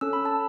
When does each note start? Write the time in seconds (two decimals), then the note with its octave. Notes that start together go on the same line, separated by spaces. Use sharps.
0.01 C#4 A4 E6
0.13 B5
0.25 A5